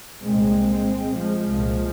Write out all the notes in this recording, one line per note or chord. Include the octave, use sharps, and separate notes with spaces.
C2 A#2 G#3 C4
F3 G#3
C2 A#2